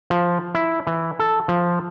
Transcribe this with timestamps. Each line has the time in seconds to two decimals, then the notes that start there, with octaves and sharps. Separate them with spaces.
0.10 F3
0.55 E4
0.87 E3
1.19 A4
1.48 F3